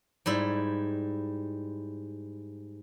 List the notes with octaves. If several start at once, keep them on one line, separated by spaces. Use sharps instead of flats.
G#2 G3 E4